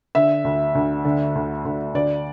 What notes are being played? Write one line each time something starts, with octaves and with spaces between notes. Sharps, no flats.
D3 E5
D2
D2
D3
D2
D2
D2 D5